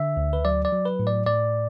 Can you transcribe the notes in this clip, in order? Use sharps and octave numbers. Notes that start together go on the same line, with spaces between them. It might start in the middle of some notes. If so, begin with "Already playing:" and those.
Already playing: D3 E5
D2
B4
F#3 D5
D5
F#3
B4
A2
D5
A2 D5